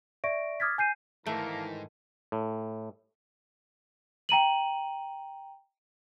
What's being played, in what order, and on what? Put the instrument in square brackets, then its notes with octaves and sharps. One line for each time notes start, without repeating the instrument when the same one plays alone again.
[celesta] D5 E5 C#6 A#6 D7
D6 D#6 F6 G#6 A6 B6
G#5 G6 C7 D#7
[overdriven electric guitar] G#2 [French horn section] D#3 E3 [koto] A3 [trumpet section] A#3 A4 A#4
[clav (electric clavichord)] A2
[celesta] G5 A#5 D#7 F#7